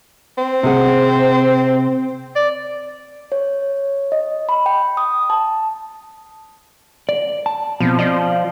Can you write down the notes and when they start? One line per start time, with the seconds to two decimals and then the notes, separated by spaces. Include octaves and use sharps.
0.38 C4
0.63 C3 G#4 F#5
2.36 D5
3.32 C#5
4.12 D#5
4.49 B5
4.66 G5
4.97 D#6
5.30 A5
7.09 D5
7.46 A5
7.80 B2 F3 C4
7.99 F3 F4 D5 D#5